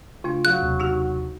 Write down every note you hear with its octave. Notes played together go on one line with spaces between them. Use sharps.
C#3 A3 D4 F4
F#3 G#4 F5 F#6
D#2 C3
D#4 F#4 G4